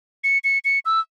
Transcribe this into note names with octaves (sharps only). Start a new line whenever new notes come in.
C#7
C#7
C#7
E6